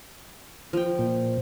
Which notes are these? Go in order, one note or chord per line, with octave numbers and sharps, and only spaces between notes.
F3 G5
A#2